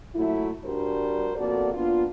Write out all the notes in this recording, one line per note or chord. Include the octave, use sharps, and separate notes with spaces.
A#2 F#3 A3 E4
G2 G3 D4 F#4 A#4 C5
F2 B2 A#3 F#4 A4 D5
A#3 B3 D4 F4